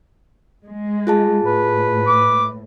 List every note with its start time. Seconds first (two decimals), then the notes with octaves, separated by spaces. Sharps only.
0.67 G#3
1.07 F4 G#4 A5
1.46 A2 B4
2.07 D6